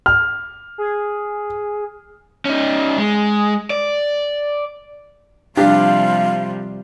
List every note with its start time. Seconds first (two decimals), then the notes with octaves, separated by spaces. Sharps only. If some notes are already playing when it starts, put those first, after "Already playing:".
0.06 F6
0.78 G#4
2.45 C#4 D#4
2.98 G#3
3.70 D5
5.57 C3 F3 G3 D4 G4 F5